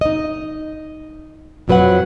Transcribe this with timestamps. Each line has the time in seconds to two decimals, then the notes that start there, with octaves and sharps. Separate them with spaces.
0.01 D#4 D#5
1.68 F2 F3 F#3 B4 C#5 F#5